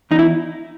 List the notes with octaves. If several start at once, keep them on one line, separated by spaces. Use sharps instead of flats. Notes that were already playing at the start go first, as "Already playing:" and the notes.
E2 D#4
E4